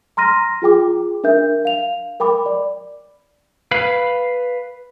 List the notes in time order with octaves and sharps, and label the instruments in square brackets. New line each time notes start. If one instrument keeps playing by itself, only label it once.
[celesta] A#5 C6 F6 A#6 D#7
F4 G#4 G5 D6
D4 A#4 E5 G6
F5 F7
A#4 G5 B5 D6
D5
[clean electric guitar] B4 F5 B5